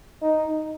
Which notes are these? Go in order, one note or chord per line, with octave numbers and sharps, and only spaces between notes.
D#4